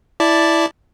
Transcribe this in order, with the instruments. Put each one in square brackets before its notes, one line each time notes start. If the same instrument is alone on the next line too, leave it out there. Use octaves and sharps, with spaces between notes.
[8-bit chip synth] E4 D5 A5